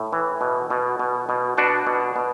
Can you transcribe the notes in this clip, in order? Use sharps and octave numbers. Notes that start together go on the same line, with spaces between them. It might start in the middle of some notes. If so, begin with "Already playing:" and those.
Already playing: A2
E3
B2
B2
B2
B2
B2 D4 F#4
B2
B2